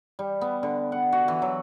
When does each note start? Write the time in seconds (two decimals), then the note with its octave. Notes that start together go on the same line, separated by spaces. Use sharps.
0.19 G3
0.41 B3
0.63 D3
0.92 F#5
1.13 F#4
1.28 E3
1.42 F#3